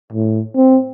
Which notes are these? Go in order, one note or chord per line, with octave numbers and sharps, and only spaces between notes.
A2
C4